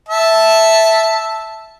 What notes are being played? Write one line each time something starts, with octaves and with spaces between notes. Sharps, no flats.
E5 A5